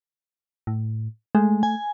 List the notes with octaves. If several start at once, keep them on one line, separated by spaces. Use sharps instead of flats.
A2
G#3 A3
G#5